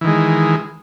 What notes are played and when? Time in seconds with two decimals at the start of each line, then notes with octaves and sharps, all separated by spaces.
0.01 E3
0.04 D#3
0.07 G#3